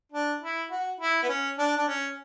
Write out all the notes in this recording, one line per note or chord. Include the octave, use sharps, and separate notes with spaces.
D4
E4
F#4
E4
B3
C#4
D4
D4
C#4